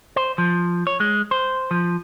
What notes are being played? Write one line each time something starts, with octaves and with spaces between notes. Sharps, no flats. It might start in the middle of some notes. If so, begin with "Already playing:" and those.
C5
F3
C#5
G#3
C5
F3